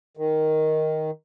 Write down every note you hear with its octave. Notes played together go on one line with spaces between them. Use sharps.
D#3